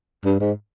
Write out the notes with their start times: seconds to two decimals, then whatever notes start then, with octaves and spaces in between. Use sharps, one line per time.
0.25 G2
0.40 G#2